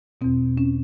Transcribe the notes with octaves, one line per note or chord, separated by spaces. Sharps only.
E2 B2 C4
C#4